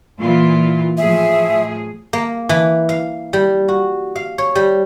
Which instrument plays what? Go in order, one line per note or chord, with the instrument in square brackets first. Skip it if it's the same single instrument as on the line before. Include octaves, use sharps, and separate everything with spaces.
[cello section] A#2 E3 F4
[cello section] A2 F3 G#4 [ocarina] E5
[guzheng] A#3
E3
F5
G3
F#4
F5
C#5
G3